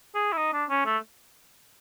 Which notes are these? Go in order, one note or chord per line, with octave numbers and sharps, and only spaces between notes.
G#4
E4
D#4
D4
C#4
A3